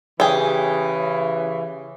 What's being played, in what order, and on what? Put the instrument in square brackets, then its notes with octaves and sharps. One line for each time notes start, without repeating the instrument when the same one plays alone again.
[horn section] C#3 E3 [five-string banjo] G4 G#4